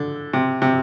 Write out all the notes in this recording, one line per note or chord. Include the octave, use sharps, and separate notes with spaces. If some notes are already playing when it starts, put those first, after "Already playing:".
Already playing: D3
C3
C3